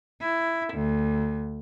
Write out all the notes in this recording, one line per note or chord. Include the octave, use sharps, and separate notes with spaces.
E4
D2